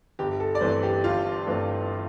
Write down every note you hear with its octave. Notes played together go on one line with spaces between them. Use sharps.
G1 G4
A4
D5
G2 E3 A3 C4 C5
G4
G1 F4
G2 E3 A3 C4